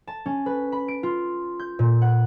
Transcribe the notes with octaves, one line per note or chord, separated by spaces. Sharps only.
A5
C#4
B4
B5
D7
F4
G6
A#2
F#5